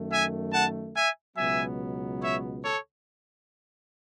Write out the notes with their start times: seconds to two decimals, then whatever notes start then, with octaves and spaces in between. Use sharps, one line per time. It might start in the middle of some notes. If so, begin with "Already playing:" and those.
Already playing: F#2 D#3 A3
0.10 E5 G#5
0.52 F#5 A5
0.95 E5 G#5
1.37 C#2 B2 F#3 B3 E5 G#5
2.21 C#5 E5
2.63 A4 C#5